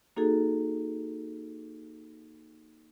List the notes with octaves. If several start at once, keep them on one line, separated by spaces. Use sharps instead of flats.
A#3 D#4 F#4 G#4 A4